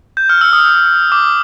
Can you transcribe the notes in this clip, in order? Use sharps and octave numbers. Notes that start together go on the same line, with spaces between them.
G6
F6
E6
D#6
D6